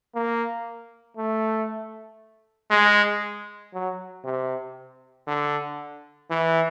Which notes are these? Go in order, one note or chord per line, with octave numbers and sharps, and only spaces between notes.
A#3
A3
G#3
F#3
C3
D3
E3